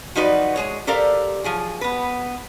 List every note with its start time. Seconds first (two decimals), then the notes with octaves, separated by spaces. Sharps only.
0.15 F3 F#3 D#4 F#4 B4 D5
0.56 G#3 G#4 C#5
0.87 G4 A4 A#4 C5 D5 F5
1.44 F3 F#3 G#4
1.81 B3 B4